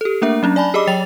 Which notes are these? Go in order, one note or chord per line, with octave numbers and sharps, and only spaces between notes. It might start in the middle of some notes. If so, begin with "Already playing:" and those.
G4 A4
A3 A#3 D4 A#4 E5
F#3 C#4 D4
D5 G#5 A5 B5
G4 G#4 D5 D#5 B5 D6
F#3 C#5 G5 A6 F7